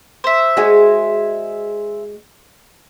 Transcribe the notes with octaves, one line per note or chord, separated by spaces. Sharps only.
C5 E5
G#3 F#4 G#4